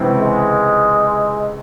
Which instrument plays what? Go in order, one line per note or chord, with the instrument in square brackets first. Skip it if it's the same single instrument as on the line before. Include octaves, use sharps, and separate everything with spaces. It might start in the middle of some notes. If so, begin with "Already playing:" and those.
Already playing: [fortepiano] C#2 C3 E3 C4 E4
[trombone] G#3